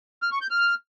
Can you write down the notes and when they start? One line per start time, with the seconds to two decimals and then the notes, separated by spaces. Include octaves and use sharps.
0.23 F6
0.32 C#6
0.41 G6
0.51 F6